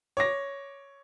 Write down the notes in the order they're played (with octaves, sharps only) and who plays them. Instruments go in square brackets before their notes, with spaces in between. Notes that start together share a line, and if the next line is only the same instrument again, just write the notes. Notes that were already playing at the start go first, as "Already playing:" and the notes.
[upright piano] C#5 D6 A#6